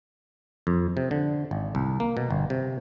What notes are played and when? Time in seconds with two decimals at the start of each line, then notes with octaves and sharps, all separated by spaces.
0.67 F2
0.97 C3
1.11 D3
1.51 G#1
1.75 C2
2.00 A#3
2.17 B2
2.31 G1
2.50 C3